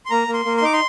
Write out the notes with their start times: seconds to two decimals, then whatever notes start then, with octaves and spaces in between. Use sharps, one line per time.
0.06 C6
0.10 A#3 A#5
0.28 A#3
0.34 C6
0.45 A#3
0.57 C6
0.62 D#4 D6
0.73 C6